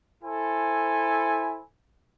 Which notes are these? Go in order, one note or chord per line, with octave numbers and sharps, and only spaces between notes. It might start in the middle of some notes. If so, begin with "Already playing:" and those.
E4 A4 C5 G#5